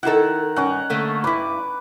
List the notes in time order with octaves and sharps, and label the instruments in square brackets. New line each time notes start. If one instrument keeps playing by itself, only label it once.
[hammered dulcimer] D#3 F#5 [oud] E4 F4 A4
[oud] G2 D#3 [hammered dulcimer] C#4 F#5
[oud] D3 A3 A#3
[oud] G2 E4 [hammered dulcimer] B4 D6